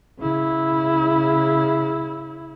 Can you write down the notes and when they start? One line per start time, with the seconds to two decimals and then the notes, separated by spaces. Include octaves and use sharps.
0.19 C#3 E4